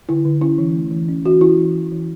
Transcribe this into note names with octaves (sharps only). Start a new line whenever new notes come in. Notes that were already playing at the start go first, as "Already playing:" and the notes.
D3 E4
D3
C#4 E4
E3
A3
E3
C#4
E3 F#4
E3 E4
E3
E3
E3